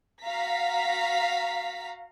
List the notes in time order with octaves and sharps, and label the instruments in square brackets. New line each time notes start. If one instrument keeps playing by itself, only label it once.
[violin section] F#4 F5 A#5 B6